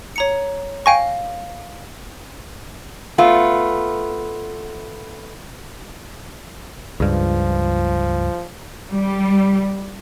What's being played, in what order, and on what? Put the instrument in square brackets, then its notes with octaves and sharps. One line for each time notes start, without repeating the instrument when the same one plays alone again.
[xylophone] C#5 A#5 C#7
[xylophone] F5 A#6 [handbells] G5 G#5 C#6
[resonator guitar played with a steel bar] A3 B3 F4
[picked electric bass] C#2 G2 [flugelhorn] F3
[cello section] G3